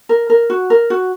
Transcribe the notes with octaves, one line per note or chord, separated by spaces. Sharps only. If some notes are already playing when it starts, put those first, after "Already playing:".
A#4
A#4
F#4
A#4
F#4